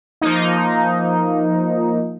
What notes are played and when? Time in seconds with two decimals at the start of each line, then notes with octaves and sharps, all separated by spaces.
0.21 F3 A#3 D#4